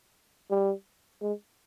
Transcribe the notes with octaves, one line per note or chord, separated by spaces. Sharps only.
G3
G#3